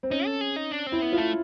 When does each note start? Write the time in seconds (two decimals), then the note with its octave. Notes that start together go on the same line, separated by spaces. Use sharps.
0.03 C4
0.10 C#4 D#4
0.26 A4
0.41 G#4
0.56 D#4
0.71 D4
0.87 C4
0.92 E4
1.02 B3
1.12 F4
1.17 A3